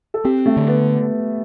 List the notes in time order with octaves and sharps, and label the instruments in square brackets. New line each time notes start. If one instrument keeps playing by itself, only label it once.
[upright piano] A4
[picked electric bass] C4 [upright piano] G4
[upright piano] A3
[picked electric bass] D3
[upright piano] B3